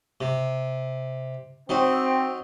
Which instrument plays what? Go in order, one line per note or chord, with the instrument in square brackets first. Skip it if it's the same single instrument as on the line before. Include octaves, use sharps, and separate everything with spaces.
[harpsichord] C3
[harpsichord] F#3 D#4 [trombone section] C4